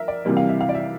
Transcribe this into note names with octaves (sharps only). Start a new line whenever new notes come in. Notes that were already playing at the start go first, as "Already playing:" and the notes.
Already playing: A#4 E5
D5
C3 E3 G3 A#3
F5
E5
F5
D5
E5